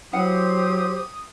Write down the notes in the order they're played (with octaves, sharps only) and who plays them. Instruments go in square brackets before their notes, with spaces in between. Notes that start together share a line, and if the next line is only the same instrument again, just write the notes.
[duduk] F#3 [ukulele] E4 F5 F#5 [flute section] G4 C5 [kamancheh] D#6